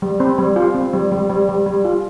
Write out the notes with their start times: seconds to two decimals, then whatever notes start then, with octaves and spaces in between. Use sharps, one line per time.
0.02 G3
0.20 C4
0.38 G3
0.56 F4
0.75 C4
0.93 G3
1.12 G3
1.30 G3
1.49 G3
1.66 G3
1.85 F4